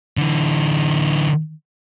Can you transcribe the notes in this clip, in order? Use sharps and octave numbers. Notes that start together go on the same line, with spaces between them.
D3 E3